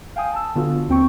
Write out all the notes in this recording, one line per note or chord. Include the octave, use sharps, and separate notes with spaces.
F5 G5 G#5 D#6
A5 E6
D3 B3 F4 F#4
D#2 C4 G5 C#6